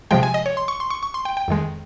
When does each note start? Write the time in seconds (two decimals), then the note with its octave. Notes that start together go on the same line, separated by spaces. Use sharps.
0.11 C3 F3 G#3 G5
0.23 G#5
0.34 D#5
0.46 C#5
0.57 C6
0.68 C#6
0.80 C6
0.90 C#6
1.03 C#6
1.14 C6
1.25 G5
1.37 G5
1.48 F2 D#3 G#3